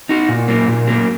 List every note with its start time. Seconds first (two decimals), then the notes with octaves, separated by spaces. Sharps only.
0.09 D#4 F#4
0.29 A#2
0.48 F#3 A#3
0.68 A#2
0.87 F#3 A#3